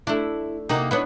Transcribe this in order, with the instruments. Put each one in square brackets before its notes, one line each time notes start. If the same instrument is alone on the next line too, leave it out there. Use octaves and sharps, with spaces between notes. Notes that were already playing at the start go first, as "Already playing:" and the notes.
[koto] A3 D4 [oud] E4
[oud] C3 A#3 F#4 [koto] D#4
[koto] B3 D4 [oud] E4 B4 C#5